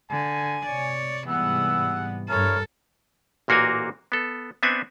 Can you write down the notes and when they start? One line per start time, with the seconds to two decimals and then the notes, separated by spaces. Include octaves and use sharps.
0.11 D3 G#5
0.66 C3 C#5 D5
1.28 G#2 C3 E3 G3 B3 G#4 F#5 E6
2.29 G2 E4 A4 A#4 C#5
3.48 A1 A#2 A#3 F#4 A#4 G#5
4.12 B3 A4
4.63 B3 C4 D4 E5 F#5 G#5